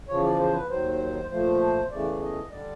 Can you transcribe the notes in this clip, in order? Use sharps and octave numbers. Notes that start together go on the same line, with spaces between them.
E2 C#3 F3 C#5
D5
C5
B4
D#2 D#3 F#3 C5
A#2 F3 A3 C5
E2 C#3 E3 A3 D5
D#5
D3 G3 D5